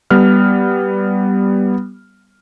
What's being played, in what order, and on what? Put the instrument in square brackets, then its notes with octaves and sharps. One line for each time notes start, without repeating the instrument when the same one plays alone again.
[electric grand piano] G3 B3 F6